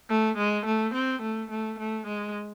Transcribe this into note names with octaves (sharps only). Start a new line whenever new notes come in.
A3
G#3
A3
C4
A3
A3
A3
G#3